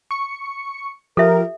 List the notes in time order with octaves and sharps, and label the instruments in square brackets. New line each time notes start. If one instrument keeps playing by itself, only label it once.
[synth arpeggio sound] C#6 C#7
[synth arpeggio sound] F3 G4 [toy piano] A4 E5 [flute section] A#4